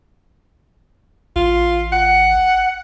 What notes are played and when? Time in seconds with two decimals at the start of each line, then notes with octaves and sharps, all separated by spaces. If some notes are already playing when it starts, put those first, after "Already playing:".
1.36 A1 F4
1.92 F#5